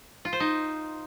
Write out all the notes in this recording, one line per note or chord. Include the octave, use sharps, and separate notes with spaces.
F4
C5
D#4